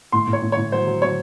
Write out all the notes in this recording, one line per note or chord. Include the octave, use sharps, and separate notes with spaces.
A2 C6
A2
C#5
A2
A2 C#5
F#3 C5
F#3
F#3 C#5